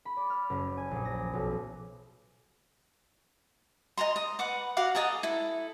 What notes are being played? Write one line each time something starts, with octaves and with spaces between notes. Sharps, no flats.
B5
D5
F6
F#1
G#5
A#1
A#6
B1
D#5 G#5 A#5 C6
D#5
B4 F#5 D6
F#4 F5 F#5 D6
A4 D#5 G#5 A#5
E4 A4